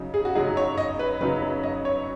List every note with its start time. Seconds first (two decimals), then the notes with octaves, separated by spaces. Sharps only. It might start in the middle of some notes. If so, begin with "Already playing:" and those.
Already playing: F#2 C#3 F#3 D#4
0.14 G#4
0.25 F#4
0.35 F#2 C#3 F#3 D#4 G#4
0.57 C#5
0.77 D#5
0.99 B4
1.21 F#2 C#3 F#3 D#4 B4
1.42 B4
1.63 D#5
1.85 C#5